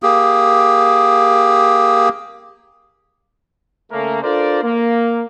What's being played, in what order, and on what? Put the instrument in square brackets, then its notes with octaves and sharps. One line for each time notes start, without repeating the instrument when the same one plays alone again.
[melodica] A#3 G4 G#4
[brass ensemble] C#3 A3 A#3
D4 F4 A4 A#4 C5 D5
A#3